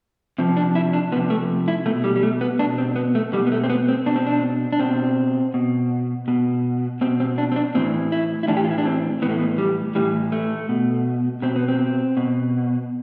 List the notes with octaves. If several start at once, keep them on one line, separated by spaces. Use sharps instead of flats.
C3 F3 C4
D4
E4
D4
C3 F3 B3
A3
E4
B2 A3
G3
G3
A3
B3
B2 D4
C4
B3
A3
B2 G3
B3
A3
C4
B3
C4
B2 D4
C4
D4
D4
B2 C4
B2
B2
B2 C4
C4
D4
C4
D4
A2 E3 C4
E4
E4
A2 E3 D4
G4
F4
E4
D4
C4
A2 E3 A3 B3
B3
G3
A2 E3 G3
A3
B2
B2 C4
B3
C4
B2